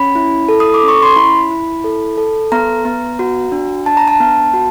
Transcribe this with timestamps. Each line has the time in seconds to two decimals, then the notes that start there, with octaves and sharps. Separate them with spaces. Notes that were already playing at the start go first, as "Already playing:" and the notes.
Already playing: C#4 B5
0.15 E4
0.49 A4
0.60 D#6
0.74 D6
0.83 C#4
0.88 C#6
1.02 C6
1.16 E4 B5
1.51 E4
1.84 A4
2.18 A4
2.52 B3 A#5
2.85 B3
3.19 F#4
3.52 D4
3.86 D4 A5
3.97 A#5
4.08 A5
4.20 B3
4.54 F#4